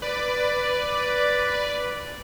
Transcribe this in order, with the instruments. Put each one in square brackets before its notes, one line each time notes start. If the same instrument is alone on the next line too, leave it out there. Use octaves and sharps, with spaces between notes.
[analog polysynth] B4 D5